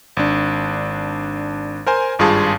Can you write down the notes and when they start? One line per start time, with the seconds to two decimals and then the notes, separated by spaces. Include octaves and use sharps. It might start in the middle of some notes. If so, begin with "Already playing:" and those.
0.17 G#1 D4
1.87 A#4 C5 G#5
2.19 G#1 G2 F4 G#4 A5